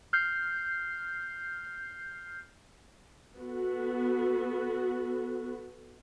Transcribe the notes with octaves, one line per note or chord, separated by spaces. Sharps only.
F6 G6 C7
B3 F#4 A4